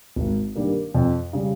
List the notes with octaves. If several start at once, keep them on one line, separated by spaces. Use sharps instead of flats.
G#1
G2 D#3 G3 A#3
F2
C#3 G3